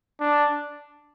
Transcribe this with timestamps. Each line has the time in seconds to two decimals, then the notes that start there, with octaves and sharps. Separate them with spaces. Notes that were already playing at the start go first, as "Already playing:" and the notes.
0.20 D4